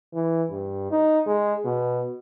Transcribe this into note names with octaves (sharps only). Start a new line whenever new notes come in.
E3
G2
D#4
G#3
B2